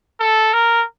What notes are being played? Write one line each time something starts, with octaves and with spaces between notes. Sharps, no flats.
A4
A#4